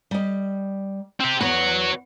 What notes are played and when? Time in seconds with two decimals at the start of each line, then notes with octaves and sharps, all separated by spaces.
0.11 G3 D#5
1.20 C4 G4
1.41 E2 B3 F#4 B4 C#5